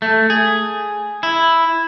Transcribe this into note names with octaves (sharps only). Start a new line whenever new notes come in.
A3
G#4
E4